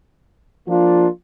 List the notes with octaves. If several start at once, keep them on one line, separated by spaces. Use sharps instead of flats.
F3 A#3 D4 F4